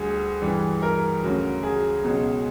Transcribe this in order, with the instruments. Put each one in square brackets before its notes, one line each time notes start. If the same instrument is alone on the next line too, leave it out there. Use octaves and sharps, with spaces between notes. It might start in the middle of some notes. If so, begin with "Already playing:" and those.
Already playing: [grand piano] D2 D3 G3 G#4
G2 E3 G3
A#4
D2 C#3 F#3
G#4
C#2 B2 F#3